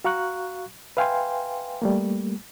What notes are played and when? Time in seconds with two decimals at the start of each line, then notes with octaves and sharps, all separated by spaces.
0.04 F#4 F5 A#5 C#6 F#6
0.97 B4 E5 F5 G5 G#5 C6
1.82 G3 A3 A#3